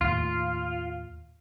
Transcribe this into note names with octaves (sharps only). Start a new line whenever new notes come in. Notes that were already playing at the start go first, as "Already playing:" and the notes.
D#2 A2 F4